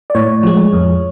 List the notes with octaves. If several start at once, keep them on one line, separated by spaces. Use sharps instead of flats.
D5
A2 C#5
F3 G#3
F2